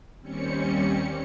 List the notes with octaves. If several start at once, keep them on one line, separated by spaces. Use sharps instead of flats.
D#2 G3 C4 C#4 C#7